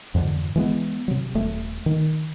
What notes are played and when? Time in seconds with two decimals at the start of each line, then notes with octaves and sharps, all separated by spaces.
0.14 F2 G#2 D3 E3
0.56 E3 G#3 B3
1.08 C3 F#3
1.35 D#1 A3
1.86 D#3